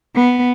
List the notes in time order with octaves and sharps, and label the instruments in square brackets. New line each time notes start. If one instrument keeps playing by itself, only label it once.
[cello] B3